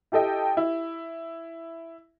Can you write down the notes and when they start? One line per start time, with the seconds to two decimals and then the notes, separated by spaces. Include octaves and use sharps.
0.12 E4 G4 A4 D#5 G5
0.57 E4